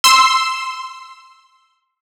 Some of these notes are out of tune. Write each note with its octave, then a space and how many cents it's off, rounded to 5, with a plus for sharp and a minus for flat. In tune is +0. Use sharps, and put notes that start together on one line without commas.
C6 +0 E6 +0